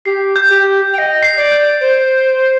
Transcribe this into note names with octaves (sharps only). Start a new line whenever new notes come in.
G4 C7
G6
G4
G6
D#5 G5 F7
C7
D5
G6
C5 D7